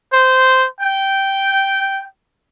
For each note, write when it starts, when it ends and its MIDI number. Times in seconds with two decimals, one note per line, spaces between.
0.11 0.65 72
0.81 2.04 79